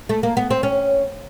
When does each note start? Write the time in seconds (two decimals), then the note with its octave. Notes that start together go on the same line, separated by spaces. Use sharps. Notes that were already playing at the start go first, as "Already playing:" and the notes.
0.09 A3
0.23 A#3
0.37 B3
0.50 C4
0.63 C#4